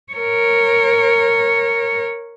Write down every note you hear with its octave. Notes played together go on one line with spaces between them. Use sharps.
A#4 C#5